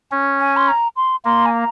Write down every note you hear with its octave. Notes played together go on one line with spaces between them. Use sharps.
C#4
G#5
C6
A#5
C6
A#3 C6
G#5
A#5